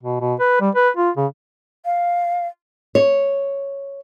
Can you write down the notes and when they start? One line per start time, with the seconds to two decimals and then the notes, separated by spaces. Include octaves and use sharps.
0.03 B2
0.20 B2
0.40 B4
0.61 G3
0.75 B4
0.97 F4
1.17 C#3
1.85 F5
2.95 C#5